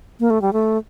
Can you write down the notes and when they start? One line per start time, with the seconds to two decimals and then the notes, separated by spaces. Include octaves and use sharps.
0.20 A#3
0.30 A3
0.42 G3
0.53 A3